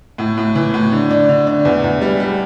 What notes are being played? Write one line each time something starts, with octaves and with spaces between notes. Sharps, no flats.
A2
A2
E3
A2
D3
D4
D3
D4
E2
E2
G3
G3